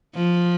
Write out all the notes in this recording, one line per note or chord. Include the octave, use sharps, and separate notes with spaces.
F3